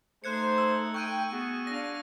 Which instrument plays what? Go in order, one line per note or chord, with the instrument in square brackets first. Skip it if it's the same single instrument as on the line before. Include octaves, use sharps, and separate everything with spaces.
[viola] A3 D#4 [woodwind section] C5 [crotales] F#6 G#6 C#7
[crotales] E6
[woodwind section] G5 [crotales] C#6 F#6 D#7
[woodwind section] B3 F#4 G#4
[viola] D4 F5 [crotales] A#6